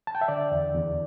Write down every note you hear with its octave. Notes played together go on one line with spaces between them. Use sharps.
A5
G5
E5
D3 D5
E2
E2